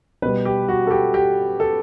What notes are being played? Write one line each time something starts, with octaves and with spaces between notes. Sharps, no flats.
B2 G3 B4
G4
F#4
A4
G4
G4
A4